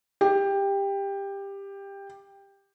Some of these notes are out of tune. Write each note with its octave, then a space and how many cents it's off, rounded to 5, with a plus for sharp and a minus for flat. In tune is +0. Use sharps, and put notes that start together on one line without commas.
G4 +15